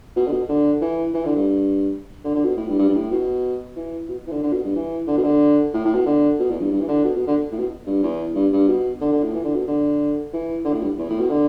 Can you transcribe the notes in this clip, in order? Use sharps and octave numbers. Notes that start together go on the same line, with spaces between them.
B2
D3
B2
D3
E3
E3
D3
G2
D3
D3
B2
A2
G2
G2
G2
A2
B2
E3
B2
E3
D3
D3
B2
G2
E3
D3
B2
D3
A2
A2
B2
D3
B2
E2
G2
G2
E3
D3
B2
B2
D3
A2
B2
G2
E2
G2
G2
B2
D3
D3
A2
E3
D3
B2
D3
E3
D3
A2
G2
E2
A2
B2
D3